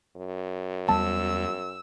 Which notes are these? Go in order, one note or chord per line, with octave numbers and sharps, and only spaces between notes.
F#2
E2 G3 B3 A5 E6